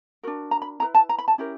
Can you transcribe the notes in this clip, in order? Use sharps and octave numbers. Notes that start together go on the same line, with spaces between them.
D4 F#4 A#4
A#5
B5
E4 G#4 B4 A#5
A5
A#5
B5
A5
C#4 E4 G4 A#4